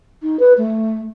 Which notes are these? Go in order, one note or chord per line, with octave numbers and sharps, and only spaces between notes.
D#4
B4
A3